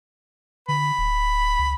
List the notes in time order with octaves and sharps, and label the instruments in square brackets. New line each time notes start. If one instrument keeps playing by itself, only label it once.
[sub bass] D3 [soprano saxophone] B5
[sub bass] D1
C#2